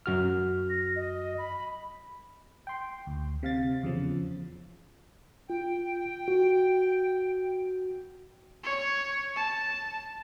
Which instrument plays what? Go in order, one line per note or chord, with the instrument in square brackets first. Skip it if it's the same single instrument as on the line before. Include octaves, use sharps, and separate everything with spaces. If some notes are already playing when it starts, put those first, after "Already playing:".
[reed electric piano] F#2 F#4 F6
[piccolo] A#6
D#5
B5
[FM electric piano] G5 C6
D2
C3 F5 A6
E2 C#3 F3
[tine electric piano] F4 [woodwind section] G5
[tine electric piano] F#4
[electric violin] C#5
A5